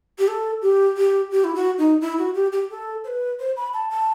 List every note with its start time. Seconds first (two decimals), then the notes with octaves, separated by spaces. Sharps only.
0.19 G4
0.28 A4
0.62 G4
0.97 G4
1.31 G4
1.44 E4
1.55 F#4
1.78 D#4
2.01 E4
2.18 F#4
2.35 G4
2.53 G4
2.70 A4
3.04 C5
3.08 B4
3.39 C5
3.57 B5
3.74 A5
3.90 A5